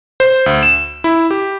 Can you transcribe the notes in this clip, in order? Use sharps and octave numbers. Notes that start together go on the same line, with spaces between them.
C5
D2
E7
E4
G4